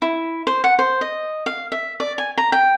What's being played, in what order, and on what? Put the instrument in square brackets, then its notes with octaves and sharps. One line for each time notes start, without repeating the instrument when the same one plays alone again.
[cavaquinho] E4
C5
F#5
C5
D#5
F5
E5
D5
G#5
A#5
G5